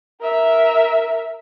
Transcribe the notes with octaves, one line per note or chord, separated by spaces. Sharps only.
A#4 E5